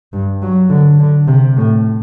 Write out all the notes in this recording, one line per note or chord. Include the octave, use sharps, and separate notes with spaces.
G2
F#3
D3
D3
C3
A2